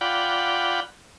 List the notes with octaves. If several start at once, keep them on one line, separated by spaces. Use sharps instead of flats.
F4 D5 F#5 G5 B5